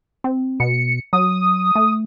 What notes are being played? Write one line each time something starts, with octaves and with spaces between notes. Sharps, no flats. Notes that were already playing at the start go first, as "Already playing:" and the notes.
C4
B2 C#7
F#3 D#6
A3